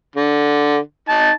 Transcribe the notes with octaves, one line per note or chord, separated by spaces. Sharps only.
D3
D#4 A5